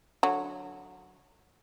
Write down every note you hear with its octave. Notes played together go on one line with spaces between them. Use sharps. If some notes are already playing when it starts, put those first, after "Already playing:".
D3 F#3